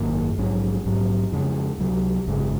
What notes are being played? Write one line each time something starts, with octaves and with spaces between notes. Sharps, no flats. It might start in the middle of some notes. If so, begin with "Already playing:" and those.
Already playing: G#1 F#2 D#3 A#3
A#1 G#2 F#3 C#4
A#1 G#2 F#3
F2 C#3 G#3 C#4
C#2 C3 F#3
G#1 F#2 C#3 G#3